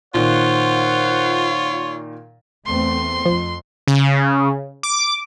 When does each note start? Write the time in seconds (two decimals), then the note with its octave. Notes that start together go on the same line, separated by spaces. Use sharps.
0.14 A#2 D#3 F4 C5 C#5 F#5
2.66 E2 A3 C4 C6
3.26 F2 F3
3.87 C#3
4.83 D6